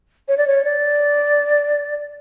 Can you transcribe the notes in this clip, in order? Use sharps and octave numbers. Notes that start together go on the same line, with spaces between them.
C#5
D5
C#5
D5